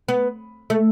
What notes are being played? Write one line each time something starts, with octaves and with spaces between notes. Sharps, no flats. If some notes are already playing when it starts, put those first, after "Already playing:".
B3
A3